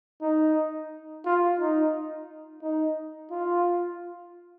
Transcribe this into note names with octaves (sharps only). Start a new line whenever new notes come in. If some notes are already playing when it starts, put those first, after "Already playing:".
D#4
F4
D#4
D#4
F4